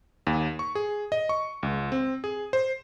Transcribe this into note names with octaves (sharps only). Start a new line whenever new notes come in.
D#2
C#6
G#4
D#5
C#6
C#2
C4
G#4
C5